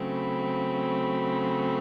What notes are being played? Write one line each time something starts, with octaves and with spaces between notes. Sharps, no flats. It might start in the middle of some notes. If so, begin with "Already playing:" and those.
Already playing: C#3 F#3 A3 C4
B5